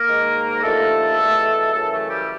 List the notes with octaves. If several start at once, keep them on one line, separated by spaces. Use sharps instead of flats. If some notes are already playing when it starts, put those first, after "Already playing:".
Already playing: A#3 A#4
G#2 D#3
D#2 D3 F3 A3 A4
E2 B2
F#2 C#3 E3 A3 A4
A3 A4
G3 G4